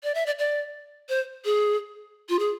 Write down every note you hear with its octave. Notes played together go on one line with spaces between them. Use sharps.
D5
E5
D5
D5
C5
G#4
F4
G#4